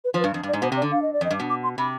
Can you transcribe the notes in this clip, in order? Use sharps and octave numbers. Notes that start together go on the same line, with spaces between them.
B4
F3 C5
B4
G2
F2
G2
D5
G#2
B2 C5
C3
D5
D3
F5
D#5
D5
F2 D#5
G2
B2
D6
C6
C3 B5